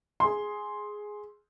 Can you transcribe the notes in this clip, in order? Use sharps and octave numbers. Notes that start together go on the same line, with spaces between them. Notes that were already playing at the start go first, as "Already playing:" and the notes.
G#4 C6